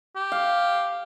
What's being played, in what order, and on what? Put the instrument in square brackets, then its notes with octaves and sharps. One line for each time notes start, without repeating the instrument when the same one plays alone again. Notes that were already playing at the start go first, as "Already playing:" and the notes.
[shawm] G4
[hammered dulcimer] F5